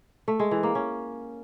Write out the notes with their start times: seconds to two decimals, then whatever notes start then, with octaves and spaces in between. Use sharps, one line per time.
0.28 A3
0.40 G#3
0.51 E3
0.63 A#3
0.75 C#4